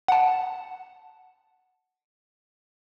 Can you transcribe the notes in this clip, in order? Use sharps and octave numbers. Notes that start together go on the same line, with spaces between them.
F#5 A5